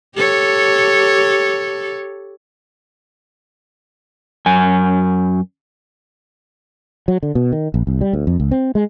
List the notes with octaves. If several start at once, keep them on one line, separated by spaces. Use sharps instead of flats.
G4 A4 C#5
F#2 G#5
F#3
D3
B2
D#3
A#1
C2
G3
D2
F2
C#2
C4
G#3